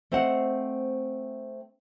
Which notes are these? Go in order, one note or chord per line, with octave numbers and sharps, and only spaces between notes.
A3 C4 C5 D#5 F#5